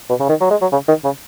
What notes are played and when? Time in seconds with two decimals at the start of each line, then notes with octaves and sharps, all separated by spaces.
0.09 B2
0.20 C#3
0.29 D#3
0.41 F#3
0.51 G#3
0.62 F#3
0.72 C#3
0.88 D#3
1.04 C#3